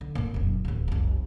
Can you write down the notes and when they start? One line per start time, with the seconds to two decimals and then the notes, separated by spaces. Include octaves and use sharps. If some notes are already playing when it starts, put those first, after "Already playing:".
0.01 D3
0.15 A#2 A3
0.34 F1 F#2
0.65 D1 A1
0.88 F1 C2